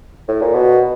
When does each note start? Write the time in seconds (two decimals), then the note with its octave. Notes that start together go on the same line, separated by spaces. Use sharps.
0.28 A2
0.42 A#2
0.55 B2